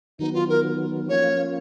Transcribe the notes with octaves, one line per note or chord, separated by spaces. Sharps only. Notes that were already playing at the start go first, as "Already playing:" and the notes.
D#3 F#3 B3 D#4
F4
A#4
F3 A#3 C#4 F4 C#5